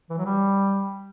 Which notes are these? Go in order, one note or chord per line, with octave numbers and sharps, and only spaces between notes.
E3
F#3
G3